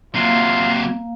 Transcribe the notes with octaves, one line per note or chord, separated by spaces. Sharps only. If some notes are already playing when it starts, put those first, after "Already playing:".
C3 F#3 A#3 F4 F5 C7